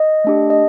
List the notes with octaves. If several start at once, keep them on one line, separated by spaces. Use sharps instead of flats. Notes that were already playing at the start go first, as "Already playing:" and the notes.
Already playing: D#5
A3 D4 G4
D#5